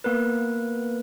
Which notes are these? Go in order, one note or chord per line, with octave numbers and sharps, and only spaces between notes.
A#3 B3 A#4 B4